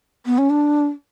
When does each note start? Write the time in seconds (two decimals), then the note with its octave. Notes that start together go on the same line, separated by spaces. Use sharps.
0.26 B3
0.38 C#4
0.50 D4